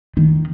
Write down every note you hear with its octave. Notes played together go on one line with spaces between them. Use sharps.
D#3